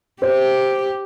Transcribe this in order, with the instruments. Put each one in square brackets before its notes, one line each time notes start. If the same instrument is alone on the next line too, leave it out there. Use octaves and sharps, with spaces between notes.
[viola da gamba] G4 [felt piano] C5